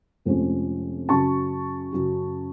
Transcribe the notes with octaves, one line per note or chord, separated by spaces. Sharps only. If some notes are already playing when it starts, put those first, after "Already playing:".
F1 F2 F3 G#3 C#4
F#2 C#3 F#3 A5 C#6
F#2 C#3 F#3